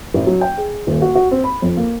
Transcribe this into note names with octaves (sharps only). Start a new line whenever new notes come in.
A1
F#3
G5
G#4
D#1
F#4
F#4
C4
B5
F2
A#3